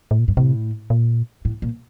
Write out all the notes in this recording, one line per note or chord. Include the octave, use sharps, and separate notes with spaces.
A2
A#2
G2
A2 C3
A#2
A2
A#2